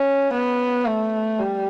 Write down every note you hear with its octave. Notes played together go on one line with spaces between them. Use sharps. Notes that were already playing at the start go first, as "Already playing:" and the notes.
Already playing: C#4
B3
A3
G3